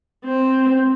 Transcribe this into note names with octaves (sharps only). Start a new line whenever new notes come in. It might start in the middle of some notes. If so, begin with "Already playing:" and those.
C4